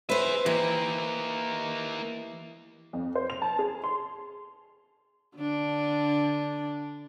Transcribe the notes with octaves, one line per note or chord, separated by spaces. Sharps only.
G#4 B4 C5 E5
E3 A#3 G4
F2
C5
F7
A5
G#4
C6
D3 D4